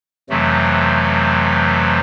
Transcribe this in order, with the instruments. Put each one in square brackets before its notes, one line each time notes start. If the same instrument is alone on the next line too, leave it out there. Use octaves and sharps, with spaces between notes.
[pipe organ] F2 C3 E3 F#3 A3